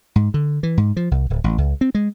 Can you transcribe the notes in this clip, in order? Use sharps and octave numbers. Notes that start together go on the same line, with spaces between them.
G#2
D3
E3
G#2
F3
C2
D1
A1
C#2
C4
G#3